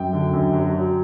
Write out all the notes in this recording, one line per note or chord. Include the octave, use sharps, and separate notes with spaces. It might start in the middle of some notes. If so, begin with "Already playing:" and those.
Already playing: F#2 G5
D3
F#2
F#3
F#3